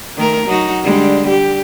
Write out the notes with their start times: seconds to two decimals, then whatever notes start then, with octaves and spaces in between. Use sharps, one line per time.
0.17 D#3 A3 A#4
0.46 F#3 D#4 F#4
0.83 D3 G3 G#3
1.28 G4